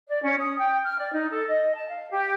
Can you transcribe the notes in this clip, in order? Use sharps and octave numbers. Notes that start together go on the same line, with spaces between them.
D5
C#4
D#6
G5
F6
D5
D#4
A4
D#5
A5
F5
G4